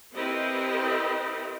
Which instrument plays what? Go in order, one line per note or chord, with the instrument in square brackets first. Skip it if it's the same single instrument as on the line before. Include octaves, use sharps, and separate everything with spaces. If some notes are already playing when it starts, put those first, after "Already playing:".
[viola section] C4 E4 G4 A#4 B4 D#5